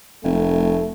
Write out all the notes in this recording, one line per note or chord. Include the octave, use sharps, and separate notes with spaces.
F1 A3